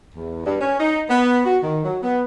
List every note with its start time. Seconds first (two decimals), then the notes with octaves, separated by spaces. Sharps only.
0.14 E2
0.45 G2
0.60 C#4
0.79 D#4
1.09 B3
1.45 F#4
1.62 D#3
1.84 F#3
2.03 B3